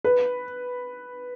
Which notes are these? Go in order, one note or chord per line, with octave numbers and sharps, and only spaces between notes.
B4